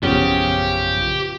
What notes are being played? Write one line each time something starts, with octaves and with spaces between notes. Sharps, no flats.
A#1 F#2 C#3 F3 B3 G4